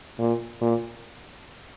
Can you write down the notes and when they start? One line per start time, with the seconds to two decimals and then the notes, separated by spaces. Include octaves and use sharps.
0.19 A#2
0.61 A#2